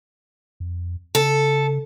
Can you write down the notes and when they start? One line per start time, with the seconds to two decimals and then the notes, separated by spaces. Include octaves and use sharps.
0.60 F2
1.15 C#3 A4